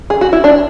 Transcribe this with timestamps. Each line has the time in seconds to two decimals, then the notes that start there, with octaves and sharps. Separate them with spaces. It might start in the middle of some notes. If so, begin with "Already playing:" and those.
0.10 G#4
0.21 F#4
0.33 E4
0.44 D4